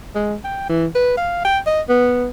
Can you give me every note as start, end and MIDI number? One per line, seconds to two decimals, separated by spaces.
0.15 0.35 56
0.44 0.67 79
0.69 0.86 52
0.95 1.16 71
1.17 1.44 77
1.44 1.59 79
1.66 1.81 75
1.89 2.29 59